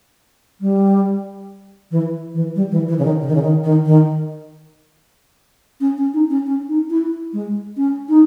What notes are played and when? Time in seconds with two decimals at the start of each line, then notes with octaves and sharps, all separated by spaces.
0.61 G3
1.91 E3
2.34 E3
2.56 G3
2.71 E3
2.88 E3
2.99 C#3
3.05 D#3
3.21 C#3
3.27 D#3
3.35 C#3
3.42 D#3
3.64 D#3
3.86 D#3
5.81 C#4
5.97 C#4
6.14 D#4
6.30 C#4
6.46 C#4
6.69 D#4
6.90 E4
7.33 G#3
7.77 C#4
8.09 D#4